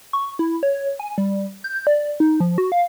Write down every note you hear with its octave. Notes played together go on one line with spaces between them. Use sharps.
C#6
E4
C#5
G#5
G3
G6
D5
D#4
F3
F#4
F5